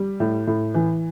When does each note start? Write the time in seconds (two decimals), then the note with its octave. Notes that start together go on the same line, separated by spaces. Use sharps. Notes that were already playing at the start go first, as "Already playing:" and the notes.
Already playing: G3
0.20 A2
0.47 A2
0.74 E3